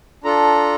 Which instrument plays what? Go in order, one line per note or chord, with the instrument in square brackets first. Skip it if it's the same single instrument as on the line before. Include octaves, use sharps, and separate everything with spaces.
[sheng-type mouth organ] D4 F4 A4 A#5